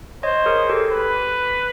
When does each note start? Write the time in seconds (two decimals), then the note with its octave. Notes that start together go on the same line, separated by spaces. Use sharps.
0.23 C5 C#5 D#5
0.46 G#4 A#4
0.69 G4 A4
0.92 B4